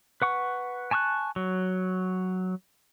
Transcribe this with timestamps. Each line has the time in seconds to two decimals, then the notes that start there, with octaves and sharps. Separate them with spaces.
0.22 B4 F#5 C#6
0.91 G#5 A5 C#6 E6 F#6
1.36 F#3